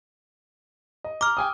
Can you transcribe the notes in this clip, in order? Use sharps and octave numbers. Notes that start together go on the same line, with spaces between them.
D#5
A#5 D6 F6
G5 G#5 D#6